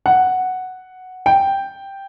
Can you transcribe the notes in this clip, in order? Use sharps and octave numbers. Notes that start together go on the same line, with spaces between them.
F#5
G5